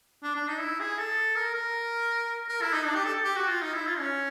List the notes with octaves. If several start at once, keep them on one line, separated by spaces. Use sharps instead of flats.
D4
D4
D#4
E4
G#4
A4
A#4
A#4
A#4
E4
D#4
D4
G4
A4
G4
F#4
F4
D#4
E4
F4
C#4